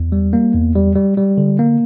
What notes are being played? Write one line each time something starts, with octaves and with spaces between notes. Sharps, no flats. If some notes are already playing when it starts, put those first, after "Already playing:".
Already playing: E2
G3
A#3
E2
G3
G3
G3
D3
A#3